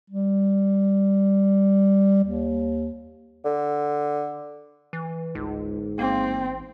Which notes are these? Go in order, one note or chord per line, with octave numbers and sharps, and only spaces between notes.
G3
D#2
D3
E3
G1 C#2 G#2
A1 A#3 C4